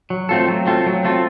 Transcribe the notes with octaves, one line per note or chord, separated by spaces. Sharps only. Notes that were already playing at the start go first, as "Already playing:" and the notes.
F#3
A3 C4 F4 A4
F#3
A3 C4 F4 A4
F#3
A3 C4 F4 A4